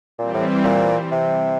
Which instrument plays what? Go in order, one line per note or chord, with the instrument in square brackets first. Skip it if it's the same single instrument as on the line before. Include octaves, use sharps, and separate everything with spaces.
[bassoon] A#2 [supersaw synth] E3 G3 C4
[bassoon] A2
A#2
C3